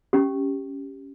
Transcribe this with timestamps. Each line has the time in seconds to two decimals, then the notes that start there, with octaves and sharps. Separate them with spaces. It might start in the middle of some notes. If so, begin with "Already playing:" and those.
0.13 C#4 G4